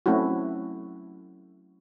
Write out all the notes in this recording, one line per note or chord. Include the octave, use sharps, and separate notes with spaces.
F#3 A3 C4 C#4 E4 F#4